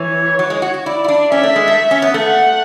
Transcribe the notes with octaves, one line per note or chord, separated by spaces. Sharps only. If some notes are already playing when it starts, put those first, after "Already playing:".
Already playing: E3 C#5
F#3
G#3
F#4
F#4
E4 D5
E4
D4
C#4 E5
A3
G#3
A3
C#4
B3
A3
F#5